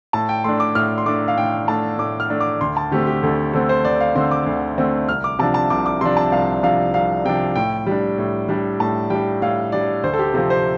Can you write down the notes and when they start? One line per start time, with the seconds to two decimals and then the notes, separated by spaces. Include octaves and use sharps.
0.13 A2 A5
0.29 G5
0.44 A3 D4 C6
0.60 D6
0.75 A2 F6
0.98 C6
1.06 A3 D4 D6
1.28 F5
1.38 A2 G5
1.68 A3 D4 A5
1.99 A2 D6
2.20 F6
2.30 A3 D4
2.41 D6
2.61 D2 C6
2.77 A5
2.91 D3 A3 C4 G4
3.07 G4
3.23 D2 A4
3.53 D3 A3 C4 A4
3.69 C5
3.85 D2 D5
4.00 F5
4.15 D3 A3 C4 C6
4.31 D6
4.46 D2
4.78 D3 A3 C4
5.09 C2 F6
5.24 D6
5.39 C3 F3 D4 A5
5.54 A5
5.70 C2 D6
5.86 D6
6.01 C3 F3 D4 C6
6.17 A5
6.32 C2 F5
6.63 C3 F3 D4 F5
6.94 C2 F5
7.25 C3 F3 D4 G5
7.56 A2 G5
7.87 G3 D4
8.18 A2
8.49 G3 D4
8.80 A2 A5
9.10 G3 D4 G5
9.42 A2 F5
9.72 G3 D4 D5
10.03 D2 C5
10.14 A4
10.19 G4
10.34 C3 F3 C4 A4
10.50 C5